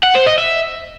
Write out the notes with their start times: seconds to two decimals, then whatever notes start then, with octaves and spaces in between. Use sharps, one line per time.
0.04 F#5
0.15 C5
0.27 D#5
0.38 E5